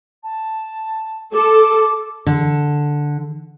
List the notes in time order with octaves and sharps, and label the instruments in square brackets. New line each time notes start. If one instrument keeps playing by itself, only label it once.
[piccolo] A5
[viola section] A4 [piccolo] D6
[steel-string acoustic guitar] D3